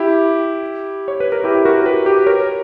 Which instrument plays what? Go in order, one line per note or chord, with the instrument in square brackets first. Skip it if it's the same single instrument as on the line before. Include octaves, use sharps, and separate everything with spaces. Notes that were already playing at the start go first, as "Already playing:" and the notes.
Already playing: [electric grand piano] E4 G4
C#5
B4
A#4
E4 G4
G4
F#4 A#4
G4 B4
G4 B4
A#4 C#5